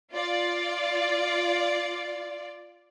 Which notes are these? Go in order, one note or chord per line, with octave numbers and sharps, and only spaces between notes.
F4 D5